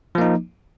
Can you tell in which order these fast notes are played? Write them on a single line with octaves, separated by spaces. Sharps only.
F3 A#3 D#4